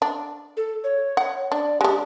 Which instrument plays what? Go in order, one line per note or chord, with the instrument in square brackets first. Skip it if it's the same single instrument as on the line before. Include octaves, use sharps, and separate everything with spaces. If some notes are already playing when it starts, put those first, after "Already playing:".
[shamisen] D4
[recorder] A4
C#5
[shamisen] F#5
[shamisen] D4 [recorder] D5
[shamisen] G#3 D4 [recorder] G4